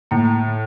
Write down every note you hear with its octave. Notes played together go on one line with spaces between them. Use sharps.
A2 A#3